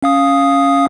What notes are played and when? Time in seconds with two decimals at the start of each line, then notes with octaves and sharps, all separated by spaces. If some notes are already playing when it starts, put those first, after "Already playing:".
0.02 C#4 F5 D#6